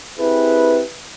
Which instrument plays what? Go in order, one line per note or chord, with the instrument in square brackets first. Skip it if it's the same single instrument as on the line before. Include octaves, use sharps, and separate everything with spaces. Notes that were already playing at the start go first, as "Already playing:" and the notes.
[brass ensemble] C4 E4 G4 G#4 B4